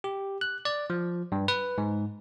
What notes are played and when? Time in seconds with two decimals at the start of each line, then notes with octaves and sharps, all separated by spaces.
0.04 G4
0.41 F#6
0.65 D5
0.90 F3
1.32 G2
1.48 B4
1.78 G#2